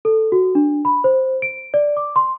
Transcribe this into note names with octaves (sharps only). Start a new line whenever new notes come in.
A4
F#4
D4
B5
C5
D7
D5
D6
C6